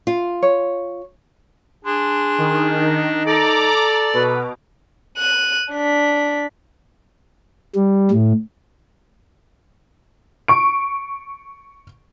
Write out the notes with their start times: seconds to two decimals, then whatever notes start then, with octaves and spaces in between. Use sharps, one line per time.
0.07 F4
0.43 C#5
1.85 D4 G#4 C6
2.38 D#3
2.79 D#4
3.26 A4 D5 A#5 D6
4.14 B2 B4
5.18 F#6 D#7
5.73 D4 B6
7.75 G3
8.11 A2
10.48 C#6 D7